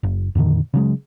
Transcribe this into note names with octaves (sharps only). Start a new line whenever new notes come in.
F#1
F2 A#2 D3 D#3
C#3 F#3 G#3